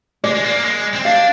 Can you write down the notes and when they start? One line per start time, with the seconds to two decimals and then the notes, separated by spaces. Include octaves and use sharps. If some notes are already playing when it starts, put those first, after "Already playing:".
0.24 G#3 D5
0.34 G#3
0.44 A#3
0.65 G#3
0.94 C4
1.05 D4 F5